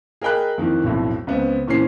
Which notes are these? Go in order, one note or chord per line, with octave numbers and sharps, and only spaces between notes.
G#4 A#4 D#5 G5 B5 F#6
F2 D#3 E3
B1 F2 A2
C#2 B3 C4
A#2 E3 C4 C#4 C7